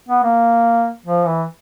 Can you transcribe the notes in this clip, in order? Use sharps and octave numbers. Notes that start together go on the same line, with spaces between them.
B3
A#3
F3
E3